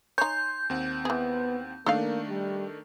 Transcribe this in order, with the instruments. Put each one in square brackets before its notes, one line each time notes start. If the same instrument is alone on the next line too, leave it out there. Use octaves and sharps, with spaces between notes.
[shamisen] D#4 C#5 [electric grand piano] G#5 C6 [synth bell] G6
[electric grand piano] D#2 C4 F#5
[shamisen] E3 G#4 [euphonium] B3
[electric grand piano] D#3 A3 D4 [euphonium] A#3 [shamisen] A4 D#5 F5
[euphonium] G3